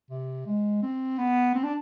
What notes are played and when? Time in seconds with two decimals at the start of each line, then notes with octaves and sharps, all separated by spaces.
0.10 C3
0.46 G#3
0.82 C4
1.18 B3
1.55 C4
1.64 D4